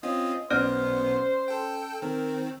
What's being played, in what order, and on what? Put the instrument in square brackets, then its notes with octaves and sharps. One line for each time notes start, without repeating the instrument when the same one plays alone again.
[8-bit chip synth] C4 C#4 F4 [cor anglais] D#5
[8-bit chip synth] B1 B3 [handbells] C#4 D5 F6 [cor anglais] C5
[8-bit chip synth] A4 G5
[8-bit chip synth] D#3 C4 [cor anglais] A#4